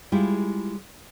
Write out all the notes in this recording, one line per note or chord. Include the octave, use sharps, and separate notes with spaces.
G3 G#3 E4 F4